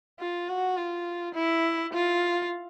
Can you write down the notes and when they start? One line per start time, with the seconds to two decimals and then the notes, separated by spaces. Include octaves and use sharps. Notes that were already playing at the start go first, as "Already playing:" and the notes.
0.20 F4
0.49 F#4
0.77 F4
1.34 E4
1.93 F4